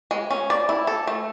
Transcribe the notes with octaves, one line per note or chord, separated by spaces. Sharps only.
G#3
C#4
D5
E4
A4
A3